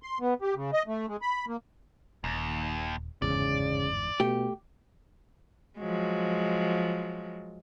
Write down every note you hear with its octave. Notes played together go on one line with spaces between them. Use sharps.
C6
B3
G4
C#3
D#5
A3
G#3
B5
A#3
D#1 D#2
G1 E2 G#2 C#3 D5
B2 A3 G4
F3 F#3 G#3